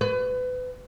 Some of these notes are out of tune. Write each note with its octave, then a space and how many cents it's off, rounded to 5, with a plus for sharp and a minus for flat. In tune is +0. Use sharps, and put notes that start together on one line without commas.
B4 +30